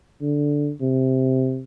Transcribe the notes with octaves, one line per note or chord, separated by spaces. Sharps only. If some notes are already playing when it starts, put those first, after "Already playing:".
D3
C3